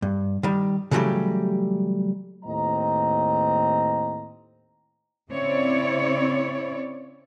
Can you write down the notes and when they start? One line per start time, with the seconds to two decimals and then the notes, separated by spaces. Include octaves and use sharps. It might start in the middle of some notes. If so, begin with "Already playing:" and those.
0.02 G2
0.43 D#3 G3
0.91 C#3 E3 F#3 G3 A3 G4
2.45 D#2 A2 C4 D#5 A#5
5.31 C#3 C4 E4 C#5 D5